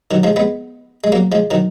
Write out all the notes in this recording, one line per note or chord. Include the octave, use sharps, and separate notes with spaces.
D#3 F#3
F3 G#3
G#3 B3
G#3
F#3 A#3
F3 G#3
D#3 F#3